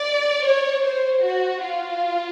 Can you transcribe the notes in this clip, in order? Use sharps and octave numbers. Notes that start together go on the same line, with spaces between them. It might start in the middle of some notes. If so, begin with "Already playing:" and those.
Already playing: D5
C#5
C5
F#4
F4